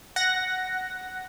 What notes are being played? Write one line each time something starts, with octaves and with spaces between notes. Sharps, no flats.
F#5 A#6